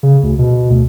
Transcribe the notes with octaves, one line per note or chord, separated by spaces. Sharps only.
C#3
D2
B2
D2